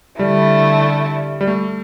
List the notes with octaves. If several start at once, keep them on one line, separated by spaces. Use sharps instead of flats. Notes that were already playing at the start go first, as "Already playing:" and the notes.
D3 G3 A3 E4
G3
A3